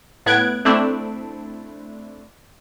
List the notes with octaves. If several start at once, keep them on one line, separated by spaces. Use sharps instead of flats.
A2 B3 F#6 G#6 D7
A3 C4 D4 E4